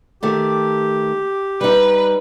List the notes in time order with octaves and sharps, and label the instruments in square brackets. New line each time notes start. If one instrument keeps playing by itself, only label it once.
[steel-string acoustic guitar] D#3 A3 [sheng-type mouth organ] G4
[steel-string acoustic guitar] G3 D#4 [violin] B4